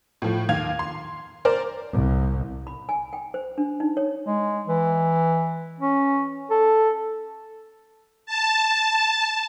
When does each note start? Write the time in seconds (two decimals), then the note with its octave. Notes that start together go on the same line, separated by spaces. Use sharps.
0.22 A2 F3
0.49 D#2 F5 G#6 F7
0.79 C6
1.45 A#4 C5 D5
1.92 C2
2.67 B5
2.89 G#5
3.13 G5
3.34 C5
3.58 D4
3.80 D#4
3.97 C#5
4.26 G#3
4.67 E3
5.80 C#4
6.51 A4
8.26 A5